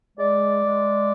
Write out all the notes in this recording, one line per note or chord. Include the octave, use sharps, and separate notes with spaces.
G#3 D5
G#3